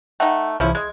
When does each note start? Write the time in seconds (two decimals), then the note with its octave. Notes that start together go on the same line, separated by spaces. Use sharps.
0.20 A3 D#4 F#5 G5
0.60 C2 E3 F3 C#4 E4
0.75 G#3 D#5 G#6